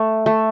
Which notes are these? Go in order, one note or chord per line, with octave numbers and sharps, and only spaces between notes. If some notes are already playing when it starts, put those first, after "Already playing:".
Already playing: A3
A3